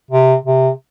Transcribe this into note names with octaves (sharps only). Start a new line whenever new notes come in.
C3
C3